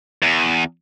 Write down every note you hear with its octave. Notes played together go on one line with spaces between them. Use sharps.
E2